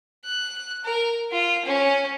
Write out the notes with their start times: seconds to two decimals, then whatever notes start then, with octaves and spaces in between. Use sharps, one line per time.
0.24 F#6
0.84 A#4
1.32 F4
1.65 C#4